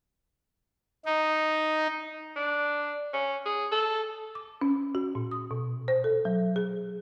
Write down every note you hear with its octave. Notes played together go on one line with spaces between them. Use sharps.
D#4
D4
C#4
G#4
A4
D6
C#4
F#4
A#2
D#6
B2
C5
A4
F#3
G#4